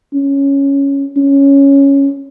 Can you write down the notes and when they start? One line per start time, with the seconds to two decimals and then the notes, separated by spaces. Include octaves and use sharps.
0.14 C#4
1.17 C#4